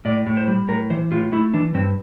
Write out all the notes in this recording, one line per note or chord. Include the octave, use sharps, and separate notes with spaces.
A2 D5
A2
C5
G3
A2 A#4
E3 C5
A2 F4
A3 E4
E3 D4
G2 C4